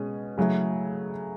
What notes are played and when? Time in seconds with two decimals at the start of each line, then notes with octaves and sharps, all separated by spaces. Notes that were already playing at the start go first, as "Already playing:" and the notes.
Already playing: B2 G#3 C#4 G#4
0.38 C#3 F#3 A3 E4 G#4